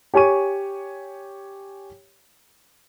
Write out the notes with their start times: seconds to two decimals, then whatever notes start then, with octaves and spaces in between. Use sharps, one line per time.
0.14 G4 C#5 G#5 C#6 D#7